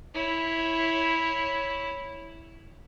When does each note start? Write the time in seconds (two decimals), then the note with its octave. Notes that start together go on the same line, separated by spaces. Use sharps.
0.14 E4 C#5